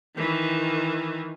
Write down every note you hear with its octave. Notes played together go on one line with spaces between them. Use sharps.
D#3 E3